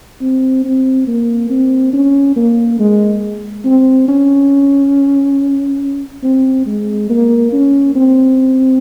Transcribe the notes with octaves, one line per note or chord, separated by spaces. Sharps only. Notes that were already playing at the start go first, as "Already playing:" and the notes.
C4
C4
A#3
C4
C#4
A#3
G#3
C4
C#4
C4
G#3
A#3
C#4
C4